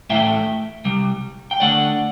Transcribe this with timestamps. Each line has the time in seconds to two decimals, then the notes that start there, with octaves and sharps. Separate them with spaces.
0.10 A2 E3 A3 E5 G5
0.85 C3 G3
1.51 G5
1.60 D3 A3 D5 F#5